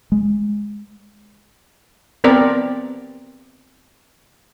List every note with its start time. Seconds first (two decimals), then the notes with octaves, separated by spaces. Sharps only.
0.12 G#3
2.24 B3 C4 A#4 D5